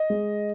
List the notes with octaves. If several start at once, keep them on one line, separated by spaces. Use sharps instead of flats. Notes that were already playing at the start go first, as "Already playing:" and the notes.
Already playing: D#5
G#3